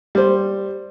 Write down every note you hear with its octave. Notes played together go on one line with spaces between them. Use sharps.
G3 C5